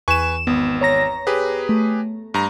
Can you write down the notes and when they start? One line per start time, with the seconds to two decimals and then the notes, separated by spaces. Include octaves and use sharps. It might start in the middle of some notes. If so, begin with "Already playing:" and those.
0.08 E2 B4 G#5 C#6 E7
0.47 G#1 B3
0.81 C#5 A#5 A#6
1.27 G4 G#4 B4
1.69 A3
2.34 G2 A#5